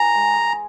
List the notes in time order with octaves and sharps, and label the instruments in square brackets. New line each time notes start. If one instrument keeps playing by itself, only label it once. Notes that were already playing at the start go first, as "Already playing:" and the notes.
Already playing: [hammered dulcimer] E3 G#4 [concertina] A#5
[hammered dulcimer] G#3
G#3